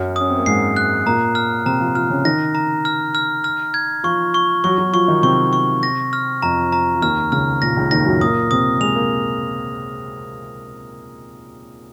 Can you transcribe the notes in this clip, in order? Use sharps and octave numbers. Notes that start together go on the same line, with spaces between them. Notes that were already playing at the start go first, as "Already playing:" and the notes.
Already playing: F#2 F#3
C#4 D#6
C4
A#3
G#2 G#3 C7
F#6
A#2 A#3 A#5
F6
C3 C4 A#5
F3 F4
F3 F4 F6
C#3 C#4
D#3 D#4 A#6
A#5
F6
F6
F6
G#6
F3 F4 C#6
C#6
F#3 F#4 C#6
F#3 F#4
F3 F4 C#6
D#3 D#4
C3 C4 C#6
C#6
A#6
F6
F2 F3 A#5
A#5
F3
D#2 D#3 F6
C#2 C#3 F6
A#2 A#6
C#2 C#3
D#2 D#3 A#6
F#2 F#3
A#2 A#3 D#6
C3 C4 D#6
G#3 F7
A#3